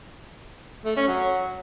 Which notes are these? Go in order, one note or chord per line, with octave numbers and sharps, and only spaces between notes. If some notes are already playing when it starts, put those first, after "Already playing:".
A3
C#4
F#3